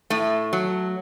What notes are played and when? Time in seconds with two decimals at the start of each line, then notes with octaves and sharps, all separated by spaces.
0.10 A2 A3
0.53 F#3